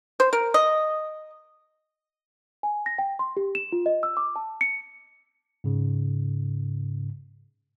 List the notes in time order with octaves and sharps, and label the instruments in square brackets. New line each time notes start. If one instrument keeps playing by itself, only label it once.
[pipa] C5
A#4
D#5
[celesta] G#5
A#6
G5
C6
G4
E7
F4
D#5
E6
D6
A5
C#7
[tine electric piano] G#2 C#3